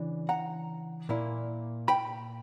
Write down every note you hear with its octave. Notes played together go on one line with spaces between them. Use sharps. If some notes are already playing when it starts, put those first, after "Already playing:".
Already playing: C#3 E3 D4
F#5 A#5
A#2 A#3 E4
G5 B5